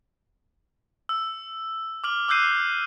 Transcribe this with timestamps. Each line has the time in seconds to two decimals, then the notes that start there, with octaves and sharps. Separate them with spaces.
1.09 E6
2.04 D6 F6 F#7
2.28 D6 E6 F#6 G6 C7 D#7